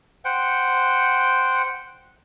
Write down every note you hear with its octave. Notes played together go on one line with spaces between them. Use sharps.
C5 F#5 G5